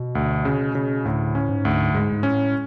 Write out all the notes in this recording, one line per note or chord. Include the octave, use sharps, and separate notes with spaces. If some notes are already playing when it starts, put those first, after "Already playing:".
Already playing: B2
D2
C#3
C#3
D2 A2
C#4
G#2
D2
G#2 G#3
G#2
A2 C#4